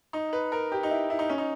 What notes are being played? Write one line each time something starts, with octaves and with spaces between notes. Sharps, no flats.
D#4
B4
A#4
G4
D#4
E4
E4
D#4
C#4
D#4